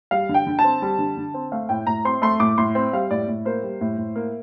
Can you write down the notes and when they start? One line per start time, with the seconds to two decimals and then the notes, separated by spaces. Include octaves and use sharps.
0.11 G3 F5
0.29 D3
0.34 G5
0.47 D3
0.59 A5
0.64 C4
0.82 G3
0.99 D3
1.17 D3
1.34 C4
1.52 A3 F5
1.69 A2 G5
1.87 A2 A#5
2.05 C4 C6
2.22 A3 C6
2.40 A2 D6
2.58 A2 C6
2.75 C4
2.93 G3 F5
3.11 A2 D5
3.28 A2
3.45 A#3 C5
3.63 G3
3.81 A2
3.98 A2
4.15 A#3